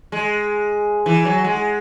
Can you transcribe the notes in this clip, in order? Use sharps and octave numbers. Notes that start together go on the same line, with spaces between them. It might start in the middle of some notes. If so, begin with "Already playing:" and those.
G#3
E3
F#3
G#3